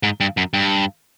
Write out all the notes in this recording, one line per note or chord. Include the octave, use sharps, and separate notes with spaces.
G#2
G2
F#2
G2